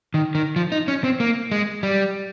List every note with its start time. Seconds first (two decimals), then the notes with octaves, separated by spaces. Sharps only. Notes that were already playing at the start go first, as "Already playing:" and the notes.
0.14 D#3
0.35 D#3
0.56 F3
0.72 D#4
0.88 C#4
1.04 C4
1.20 A#3
1.51 G#3
1.83 G3